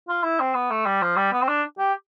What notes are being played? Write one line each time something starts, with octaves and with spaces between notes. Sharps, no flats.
F4
E4
C4
B3
A3
G3
F3
G3
B3
C4
D4
G4